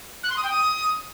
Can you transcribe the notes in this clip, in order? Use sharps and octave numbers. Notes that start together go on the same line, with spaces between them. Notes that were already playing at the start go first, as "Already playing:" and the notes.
F#6
C6
D#6
G5
D#6